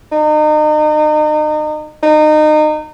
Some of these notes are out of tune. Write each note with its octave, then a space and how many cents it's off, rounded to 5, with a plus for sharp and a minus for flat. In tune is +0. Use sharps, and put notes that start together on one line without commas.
D#4 -35
D#4 -30